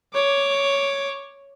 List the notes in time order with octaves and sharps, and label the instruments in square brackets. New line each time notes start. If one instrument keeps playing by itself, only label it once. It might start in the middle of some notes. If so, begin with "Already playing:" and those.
[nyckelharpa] C#5 D6